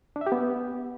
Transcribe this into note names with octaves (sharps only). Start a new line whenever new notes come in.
D4
E5
G4
B3